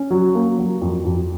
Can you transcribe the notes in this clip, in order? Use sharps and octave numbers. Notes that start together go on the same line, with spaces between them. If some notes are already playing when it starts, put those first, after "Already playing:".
Already playing: C#4
F#3
A#3
F#3
F2
F2